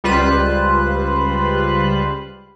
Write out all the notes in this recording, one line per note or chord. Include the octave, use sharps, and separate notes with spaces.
C#2 G3 F4 B4 C5 F#6